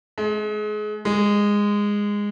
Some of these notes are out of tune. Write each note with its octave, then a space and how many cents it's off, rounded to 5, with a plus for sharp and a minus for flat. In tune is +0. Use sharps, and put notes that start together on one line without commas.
G#3 +30
G#3 -15